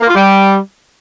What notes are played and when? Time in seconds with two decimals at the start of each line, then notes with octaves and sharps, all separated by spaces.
0.01 A#3
0.08 F4
0.15 G3